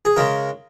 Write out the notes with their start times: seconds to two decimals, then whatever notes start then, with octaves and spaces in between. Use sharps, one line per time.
0.05 G#4
0.16 C#3 G#3 A#4